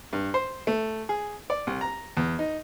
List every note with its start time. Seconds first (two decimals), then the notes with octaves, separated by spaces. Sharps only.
0.13 G2
0.34 C5
0.67 A3
1.09 G#4
1.50 D5
1.67 C2
1.81 A#5
2.17 E2
2.39 D#4